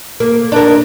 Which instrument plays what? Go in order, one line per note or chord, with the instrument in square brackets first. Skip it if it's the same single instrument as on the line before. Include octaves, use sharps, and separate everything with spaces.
[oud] A#3
D4 A#4